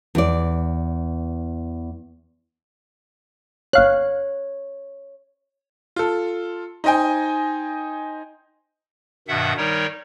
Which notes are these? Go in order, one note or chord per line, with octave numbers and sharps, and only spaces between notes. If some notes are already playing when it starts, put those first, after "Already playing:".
E2 D5
G1 C#5 F5 F#6
F4 A4
D#4 C5 D#5 G5 G#5
G2 B2 D#3 E5 F#5
D#3 G3 D#4 A#4 C#5